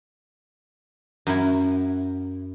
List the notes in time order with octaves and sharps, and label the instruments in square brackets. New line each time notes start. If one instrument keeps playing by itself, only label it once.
[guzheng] F#2 E4